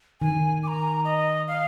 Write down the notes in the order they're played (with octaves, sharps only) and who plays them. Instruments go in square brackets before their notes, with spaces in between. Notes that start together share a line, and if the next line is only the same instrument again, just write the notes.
[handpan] D#3 [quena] G#5
[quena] D6
A#5
D#5
F5